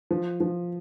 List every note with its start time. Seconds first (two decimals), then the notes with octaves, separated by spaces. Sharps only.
0.11 F3
0.40 F3